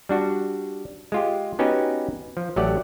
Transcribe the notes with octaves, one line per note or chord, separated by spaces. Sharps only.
G3 D4 F#4
G#3 F4 G4
B3 C#4 D#4 F#4 G4 B4
F3
A1 F#3 A3 G4 D5 F#5